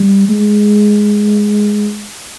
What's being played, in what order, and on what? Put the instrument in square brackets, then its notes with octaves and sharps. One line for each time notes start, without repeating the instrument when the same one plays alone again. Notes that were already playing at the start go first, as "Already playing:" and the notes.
Already playing: [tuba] G3
G#3